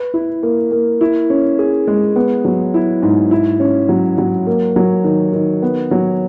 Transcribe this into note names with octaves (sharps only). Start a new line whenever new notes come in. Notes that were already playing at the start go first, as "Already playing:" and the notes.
Already playing: B4
E4
A#3
A#3
E4
C#4
G#4
G#3
B3
F#3
E4
G#2
E4
C#4
F#3
F#3
A#3
F#3
D#3
D#3
B3
F#3